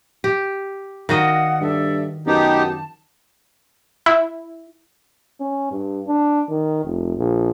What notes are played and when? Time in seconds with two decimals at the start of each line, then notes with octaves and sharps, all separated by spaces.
0.24 G4
1.09 D#3 F#4 D5 D#5 F5 F#5
1.61 G2 A4 D5 E5
2.27 F#2 B3 D#4 G4 A5
4.06 E4
5.40 C#4
5.71 G2
6.07 D4
6.50 D#3
6.85 F1
7.17 A#1